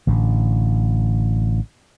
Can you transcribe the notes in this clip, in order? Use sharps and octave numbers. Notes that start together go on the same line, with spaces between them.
A1 A2 D3